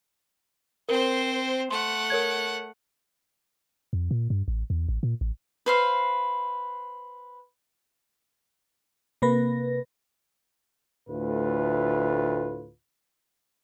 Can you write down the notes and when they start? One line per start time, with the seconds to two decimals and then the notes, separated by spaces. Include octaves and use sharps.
0.89 C4 A#4 C5
1.71 A3 F#5 C6
2.10 A#4 C#5 G#6
3.93 F2
4.11 A#2
4.30 G2
4.48 A1
4.70 E2
4.89 A1
5.03 A#2
5.21 A1
5.66 B4 C5 F5
9.22 C3 A#3 B4 A#6
11.08 D2 A2 F4 B4